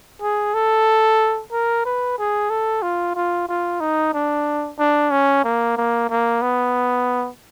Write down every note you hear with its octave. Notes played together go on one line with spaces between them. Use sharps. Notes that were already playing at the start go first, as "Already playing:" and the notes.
G#4
A4
A#4
B4
G#4
A4
F4
F4
F4
D#4
D4
D4
C#4
A#3
A#3
A#3
B3